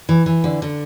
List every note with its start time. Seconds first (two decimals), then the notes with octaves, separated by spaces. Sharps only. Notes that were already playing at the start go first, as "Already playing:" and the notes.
0.09 E3
0.26 E3
0.44 D3
0.62 D3